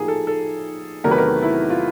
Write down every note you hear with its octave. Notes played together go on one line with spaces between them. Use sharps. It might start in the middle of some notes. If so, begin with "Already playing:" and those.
Already playing: A#1 A2 F3 A#3 D#4 G4 G#4
A4
A4
E2 C3 D#3 F#3 A3 A#4
B4
A#4
E4
F4